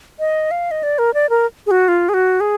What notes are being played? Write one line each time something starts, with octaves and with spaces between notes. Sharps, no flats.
D#5
F5
D#5
D5
A#4
D5
A#4
G#4
F#4
F4
G#4
F#4
G#4